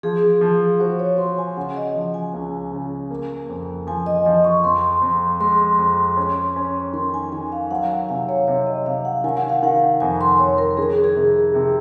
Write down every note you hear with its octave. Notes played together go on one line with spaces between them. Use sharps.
F3 G#4
F3
F#4 C5
C#5
F#4 C6
G#5
C#3 F#5
D#5
F3
G#5
C#2
C#3
A#3
F2
F3 G#5
D#5
F3 D#5
C#6
F2 C6
F2
G#3 C6
F2
C#4
C#4
D#3 C6
G#5
D#3 G#5
F5
F#3 F#5
G#5
C3 F5
C#5
C3 C#5
D#5
C3 F5
F#5
D#3 G#5
F#5
F5
D#3 F#5
F2 G#5
C6
F2 C#5
A#4
D#3 G#4
A#4
G#4
C3
C3